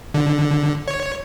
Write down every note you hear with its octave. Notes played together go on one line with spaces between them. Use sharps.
D3
C#5